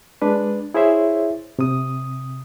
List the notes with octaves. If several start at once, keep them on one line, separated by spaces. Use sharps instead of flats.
G#3 D4 B4
E4 G#4 C5 C#5 E5
C3 D#6